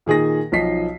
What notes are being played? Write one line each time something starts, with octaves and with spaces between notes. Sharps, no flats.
A#2 D#3 G#4 G#5 A#6
B1 F3 D#4 D#5 B6 C7